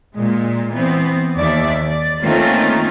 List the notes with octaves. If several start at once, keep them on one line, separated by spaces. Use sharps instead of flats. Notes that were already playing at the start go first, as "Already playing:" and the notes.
A#2 G#3
E3 B3 C4
D#2 D5 E5
D5
D#3 A3 A#3 C4 C#4 F4